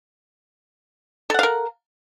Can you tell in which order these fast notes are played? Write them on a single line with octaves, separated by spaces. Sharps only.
A4 F#5 F5 A#4